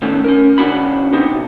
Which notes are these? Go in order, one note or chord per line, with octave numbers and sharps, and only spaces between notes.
A2 D#3 A3 B3 C#4
C#4 A#4
F#2 C#3 C#4 D4 F#4 B5
B3 C4 D#4 G4
B1